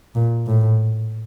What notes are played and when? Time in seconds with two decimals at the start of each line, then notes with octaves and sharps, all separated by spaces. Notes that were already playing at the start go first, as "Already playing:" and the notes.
0.15 A#2
0.47 A2